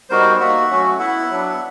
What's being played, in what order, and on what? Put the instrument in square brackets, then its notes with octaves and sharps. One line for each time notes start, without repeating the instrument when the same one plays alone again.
[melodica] G3 B3 D#4 F#4 A#4 C5
A#3 D#4 F#4 E5 F#5
F#3 A3 C#4 F#4
B3 E4 E5 F#5
F#3 B3 D4